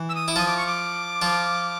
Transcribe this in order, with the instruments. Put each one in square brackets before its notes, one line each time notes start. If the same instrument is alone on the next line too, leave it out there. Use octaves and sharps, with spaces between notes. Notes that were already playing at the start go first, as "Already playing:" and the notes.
Already playing: [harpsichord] E3
[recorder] E6
D#6
[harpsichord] E4
[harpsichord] F3 F4 [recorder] D#6
[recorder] D6
C#6
D6
[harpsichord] F3 F4